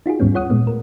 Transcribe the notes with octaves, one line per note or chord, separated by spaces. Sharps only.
D#4 F4 F#4 G#4
D#2 G#2 G3 B3 C#4
F4 C#5 F#5 D#6
A#2 G#3 A3 B3
A#4